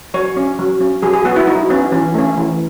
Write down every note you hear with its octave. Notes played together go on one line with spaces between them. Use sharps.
F#3 C#5
C#4
F#3
C#4
F#3 G#4
G#4
B3 F#4
E4
F#3 D#4
B3 C#4
E3 C#4
A3 C#4
E3